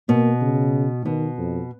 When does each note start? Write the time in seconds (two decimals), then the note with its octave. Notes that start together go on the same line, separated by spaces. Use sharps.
0.09 B2 A#3
0.42 C#3
1.05 B2 D#3
1.38 F2